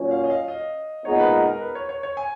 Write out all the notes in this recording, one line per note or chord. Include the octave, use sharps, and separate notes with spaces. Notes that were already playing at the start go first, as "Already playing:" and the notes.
Already playing: A#2 F#3 C#4
F5
D#5
F5
D#5
A#2 G#3 B3 D#4 C#5
B4
A#4
A#4
B4
C#5
C#5
C#5
G#5